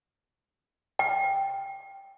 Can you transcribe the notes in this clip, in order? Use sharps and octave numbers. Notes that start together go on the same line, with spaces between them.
G5